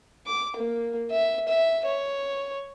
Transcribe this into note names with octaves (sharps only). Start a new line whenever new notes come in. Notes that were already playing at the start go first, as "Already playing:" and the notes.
D6
A#3
E5
E5
C#5